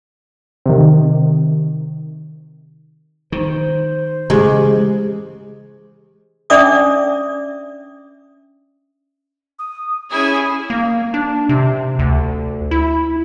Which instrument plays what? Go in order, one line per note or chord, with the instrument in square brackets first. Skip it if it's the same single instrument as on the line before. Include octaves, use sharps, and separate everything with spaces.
[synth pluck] C3 D#3
[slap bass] D#3 [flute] C5
[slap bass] C#3 E3 [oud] G#3 [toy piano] G4 G#4
[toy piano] C#4 D4 D5 E5 D6 D#6
[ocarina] D#6
[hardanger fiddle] C#4 G#4 [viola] E4 G#5 [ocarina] D#6
[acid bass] A#3
D4
C3
D2
E4